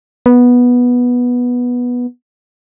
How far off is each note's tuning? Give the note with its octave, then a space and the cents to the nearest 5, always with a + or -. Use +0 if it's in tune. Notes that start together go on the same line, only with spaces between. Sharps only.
B3 -10